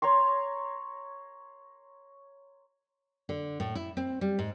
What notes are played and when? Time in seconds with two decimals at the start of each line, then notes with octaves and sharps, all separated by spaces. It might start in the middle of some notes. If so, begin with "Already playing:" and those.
0.02 C#5 A#5 C6 C#6
3.29 D3
3.60 A2
3.75 E4
3.97 C4
4.21 G3
4.39 G#2